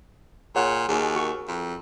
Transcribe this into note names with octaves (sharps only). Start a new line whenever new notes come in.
A#2 G#4 C#5 F#5
D#2 F#4 G#4
F#4 A#4 C#6
F2